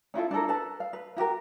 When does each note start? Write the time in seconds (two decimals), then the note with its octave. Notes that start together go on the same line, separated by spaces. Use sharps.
0.14 C#4 E4 F4 A4
0.31 D4 E4 A4 A#4
0.48 A4 B4 A5
0.80 F5
0.93 B4
1.17 E4 F#4 G4 A#4